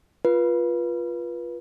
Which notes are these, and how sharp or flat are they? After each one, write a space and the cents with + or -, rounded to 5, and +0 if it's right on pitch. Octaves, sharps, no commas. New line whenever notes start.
F4 +0 B4 -25